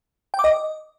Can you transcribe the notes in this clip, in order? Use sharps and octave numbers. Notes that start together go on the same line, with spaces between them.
G5
D6
D#5